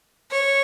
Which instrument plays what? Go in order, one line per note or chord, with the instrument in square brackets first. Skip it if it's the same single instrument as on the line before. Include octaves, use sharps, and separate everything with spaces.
[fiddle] C#5